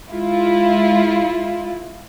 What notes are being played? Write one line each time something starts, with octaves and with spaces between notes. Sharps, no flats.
G#3 E4 F4